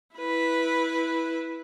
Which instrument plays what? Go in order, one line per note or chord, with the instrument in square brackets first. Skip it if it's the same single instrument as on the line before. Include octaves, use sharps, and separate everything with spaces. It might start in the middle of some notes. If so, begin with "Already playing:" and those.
[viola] E4 B4